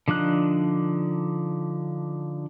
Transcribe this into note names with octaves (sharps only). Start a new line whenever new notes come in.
D3 F3 D4 D#4 F#6